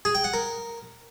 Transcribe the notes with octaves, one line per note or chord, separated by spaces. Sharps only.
G#4
G5
F#5
A#4